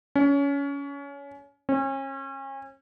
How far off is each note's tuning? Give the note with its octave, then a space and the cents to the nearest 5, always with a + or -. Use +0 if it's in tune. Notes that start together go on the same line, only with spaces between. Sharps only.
C#4 +25
C#4 -35